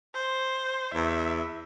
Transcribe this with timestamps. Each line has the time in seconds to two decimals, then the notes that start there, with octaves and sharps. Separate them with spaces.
0.15 C5
0.94 E2 E5